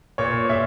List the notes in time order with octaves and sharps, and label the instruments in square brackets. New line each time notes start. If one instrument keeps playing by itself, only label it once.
[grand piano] A#2 C#5
A#2 E5